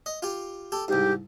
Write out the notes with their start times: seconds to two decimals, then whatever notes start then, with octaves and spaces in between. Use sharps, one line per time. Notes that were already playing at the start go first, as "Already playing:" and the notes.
0.06 D#5
0.22 F4 G4
0.72 G4 A4
0.88 C2 G#2 G4